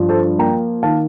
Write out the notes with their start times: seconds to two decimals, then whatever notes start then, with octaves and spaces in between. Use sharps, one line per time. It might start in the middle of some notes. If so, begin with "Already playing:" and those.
Already playing: G2 F3
0.09 A4 C5
0.39 A#3 G5 A#5
0.83 D#3 F5 A5